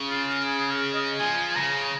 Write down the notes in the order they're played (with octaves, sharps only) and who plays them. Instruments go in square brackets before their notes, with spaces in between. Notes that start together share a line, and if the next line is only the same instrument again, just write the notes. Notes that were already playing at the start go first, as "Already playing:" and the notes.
Already playing: [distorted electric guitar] C#3
[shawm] F4
A#4
G#4
G#4
A#4
D#5
[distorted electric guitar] F3 [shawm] G#5
[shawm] G#5
[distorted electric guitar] C#3 [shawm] A#5